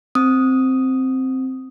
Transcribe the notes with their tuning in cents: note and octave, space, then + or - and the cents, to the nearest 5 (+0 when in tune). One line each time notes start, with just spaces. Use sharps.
C4 +0 D#6 +0